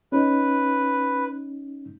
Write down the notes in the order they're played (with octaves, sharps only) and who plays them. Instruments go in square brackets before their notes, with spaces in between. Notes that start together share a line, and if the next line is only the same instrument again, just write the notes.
[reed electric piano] C#4 D#4 [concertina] B4